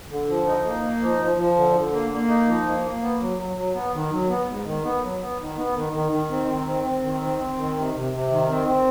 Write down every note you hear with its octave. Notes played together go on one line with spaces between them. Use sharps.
D3
F3
D#4
A#3
D#4
F3
F3
F3
D3
D3
A#3
A#3
D#4
F3
A#3
A#3
B3
F#3
F#3
F#3
B3
D#3
F#3
B3
G#2
D#3
B3
F#3
B3
D#3
B3
D#3
D#3
D#3
C4
D#3
C4
C4
D#3
C4
C4
D#3
C3
C3
C3
D#3
C4
C4